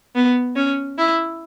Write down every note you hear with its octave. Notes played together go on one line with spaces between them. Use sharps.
B3
C#4
E4